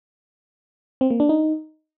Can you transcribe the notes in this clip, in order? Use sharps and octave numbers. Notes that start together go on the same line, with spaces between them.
C4
A#3
D4
D#4